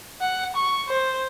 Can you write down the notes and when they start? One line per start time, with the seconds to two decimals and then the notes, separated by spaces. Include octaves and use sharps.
0.21 F#5
0.55 C#6
0.88 C5